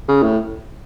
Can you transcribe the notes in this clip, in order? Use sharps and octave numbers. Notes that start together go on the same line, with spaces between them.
C#3
A2